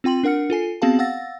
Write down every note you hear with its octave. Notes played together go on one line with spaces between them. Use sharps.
C4 F4 G5 C6 F#7
D4 A#4 F#5 F6 C#7
F4 A4 G#5 C7
B3 C4 F#4 G#4 F5 A5
F5 F#5 E6 A6 A#6